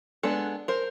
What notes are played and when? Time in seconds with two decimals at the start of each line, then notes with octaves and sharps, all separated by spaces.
0.23 G#3 B3 D4 A4 B4
0.68 A#4 C5